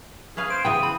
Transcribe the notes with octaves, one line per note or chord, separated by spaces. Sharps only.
C#4 G#4 B4 F5
C5 D7
C#3 E3 B3 G5 D#6
C4 B5